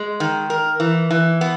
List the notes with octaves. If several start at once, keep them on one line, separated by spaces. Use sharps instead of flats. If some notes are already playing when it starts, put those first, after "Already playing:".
Already playing: G#3
D#3
A#4
E3
E3
B3